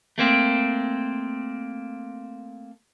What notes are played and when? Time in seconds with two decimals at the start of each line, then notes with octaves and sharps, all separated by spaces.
0.18 A3 A#3 C4